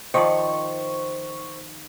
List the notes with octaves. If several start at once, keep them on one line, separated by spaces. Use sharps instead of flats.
D#3 F3 C5 D5 C#6